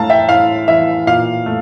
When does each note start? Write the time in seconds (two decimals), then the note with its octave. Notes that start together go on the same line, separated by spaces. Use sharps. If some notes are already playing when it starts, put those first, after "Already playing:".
Already playing: A2 A3 F5 A5 A#5
0.10 E5 G5
0.29 A2 F5
0.68 E3 E5
1.07 A#2 F5
1.46 A3